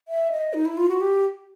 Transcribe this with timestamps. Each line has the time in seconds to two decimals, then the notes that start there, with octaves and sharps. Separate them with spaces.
0.08 E5
0.31 D#5
0.54 D#4
0.65 E4
0.77 F4
0.89 F#4
1.01 G4